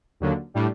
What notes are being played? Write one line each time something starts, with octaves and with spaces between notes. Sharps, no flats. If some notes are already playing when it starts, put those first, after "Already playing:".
D#2 D3 F#3 A#3 D4
A2 G3 D4